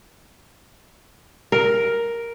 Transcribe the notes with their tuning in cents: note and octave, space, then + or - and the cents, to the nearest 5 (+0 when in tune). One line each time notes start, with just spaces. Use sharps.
A#4 +5